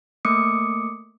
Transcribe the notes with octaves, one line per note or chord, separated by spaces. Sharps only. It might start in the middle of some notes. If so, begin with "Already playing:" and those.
A3 A#3 D6 D#6 C#7